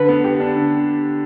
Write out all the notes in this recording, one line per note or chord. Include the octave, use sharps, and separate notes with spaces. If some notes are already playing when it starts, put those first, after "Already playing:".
Already playing: D3 B4
B3
G4
D4
D3